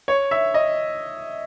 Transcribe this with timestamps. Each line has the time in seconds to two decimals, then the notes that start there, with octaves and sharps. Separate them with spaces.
0.08 C#5
0.31 E5
0.54 D#5